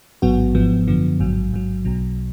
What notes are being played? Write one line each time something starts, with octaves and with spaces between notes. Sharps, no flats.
A1 G#2 F#3 B3 F#4
G#1 G#2 F3 B3
F#2 D3 F3 B3
A1 G#2 F#3
A1 G#2 F#3
B1 B2 F#3